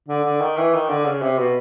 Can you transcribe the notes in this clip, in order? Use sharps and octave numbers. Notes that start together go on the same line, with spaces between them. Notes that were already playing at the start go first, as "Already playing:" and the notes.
D3
D3
D#3
E3
D#3
D3
C#3
C3
B2